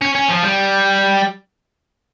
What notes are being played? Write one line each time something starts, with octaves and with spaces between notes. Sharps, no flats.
C#4
C#4
F3
G3